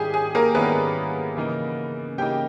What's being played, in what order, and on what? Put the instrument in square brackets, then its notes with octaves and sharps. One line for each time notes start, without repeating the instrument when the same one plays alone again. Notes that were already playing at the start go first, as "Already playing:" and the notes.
Already playing: [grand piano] G#2 D#3 G3 C#4 E4 [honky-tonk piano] G4 G#4
[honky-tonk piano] G#4
A#3 A#4
[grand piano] G#2 D#3 G3 C#4 E4 [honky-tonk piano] B3 B4
[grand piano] C#3 E3 A#3 D#4
[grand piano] C#3 E3 A#3 D#4 [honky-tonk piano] G4 G5